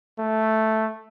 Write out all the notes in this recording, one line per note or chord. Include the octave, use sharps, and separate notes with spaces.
A3